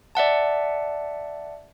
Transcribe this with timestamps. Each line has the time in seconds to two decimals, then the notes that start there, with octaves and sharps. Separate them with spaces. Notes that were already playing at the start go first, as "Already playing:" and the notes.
0.15 D5 E5 F#5 A5